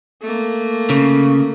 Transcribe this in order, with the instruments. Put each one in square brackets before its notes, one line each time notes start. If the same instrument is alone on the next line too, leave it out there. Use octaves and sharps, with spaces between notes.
[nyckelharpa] A3 A#3
[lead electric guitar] C#3